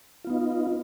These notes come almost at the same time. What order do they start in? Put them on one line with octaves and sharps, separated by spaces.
F4 B3 D#4